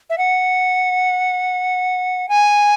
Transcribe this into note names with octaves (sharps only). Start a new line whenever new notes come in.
E5
F#5
G#5